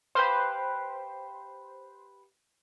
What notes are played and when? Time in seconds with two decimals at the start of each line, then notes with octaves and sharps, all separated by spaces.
0.15 G4 B4 C5 F5